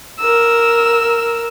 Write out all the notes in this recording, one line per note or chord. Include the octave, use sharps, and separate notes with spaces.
A#4 E6